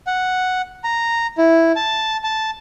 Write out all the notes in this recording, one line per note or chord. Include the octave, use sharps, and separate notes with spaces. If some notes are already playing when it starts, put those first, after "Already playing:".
F#5
A#5
E4
A5
A5